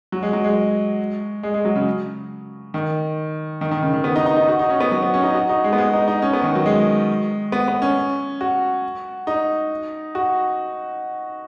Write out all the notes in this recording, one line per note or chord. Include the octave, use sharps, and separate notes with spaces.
F#3
G#3
F#3
G#3
G#3
G#3
F#3
C#3
D#3
D#3
D#3
C#3
D#3
B3
D#4
D#4
D#4
F#4
D#4
C#4
B3
F#3
B3
C#4
D#4
F#4
D#4
G#3
B3
G#3
D#4
D#4
C#4
B3
D#3
F#3
G#3
B3
B3
C#4
F#4
D#4
F#4